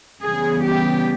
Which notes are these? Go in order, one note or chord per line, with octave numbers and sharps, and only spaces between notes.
C#3 E3 G3 B3 G#4
G4